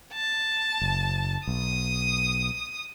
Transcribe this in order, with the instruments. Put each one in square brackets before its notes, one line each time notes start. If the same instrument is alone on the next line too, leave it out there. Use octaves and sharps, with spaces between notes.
[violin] A5
[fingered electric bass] F#1
[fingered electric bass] B1 [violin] D#6